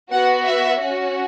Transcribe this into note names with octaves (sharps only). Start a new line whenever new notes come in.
B3 F#4 F#5
E5
C#4 F#4